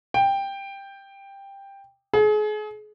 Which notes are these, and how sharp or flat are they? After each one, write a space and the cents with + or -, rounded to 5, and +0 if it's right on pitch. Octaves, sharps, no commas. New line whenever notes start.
G5 +10
G#4 +35